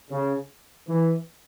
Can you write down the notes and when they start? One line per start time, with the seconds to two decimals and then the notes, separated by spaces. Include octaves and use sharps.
0.11 C#3
0.88 E3